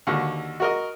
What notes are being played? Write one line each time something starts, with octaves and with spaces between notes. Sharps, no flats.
D#2 D3 F#4
F#4 A#4 D#5